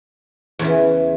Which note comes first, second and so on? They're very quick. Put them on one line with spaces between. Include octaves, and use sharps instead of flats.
E2 C#3 E3